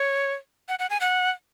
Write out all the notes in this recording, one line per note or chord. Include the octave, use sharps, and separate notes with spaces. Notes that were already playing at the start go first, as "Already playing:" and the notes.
Already playing: C#5
F#5
F#5
G#5
F#5